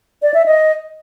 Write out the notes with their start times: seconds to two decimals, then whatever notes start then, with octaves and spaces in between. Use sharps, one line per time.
0.22 D5
0.34 E5
0.46 D#5